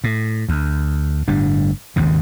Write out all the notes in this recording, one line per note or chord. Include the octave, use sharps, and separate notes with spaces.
A2
D2
G1 A2 G3 D4
G#1 D#2 G#2 C#3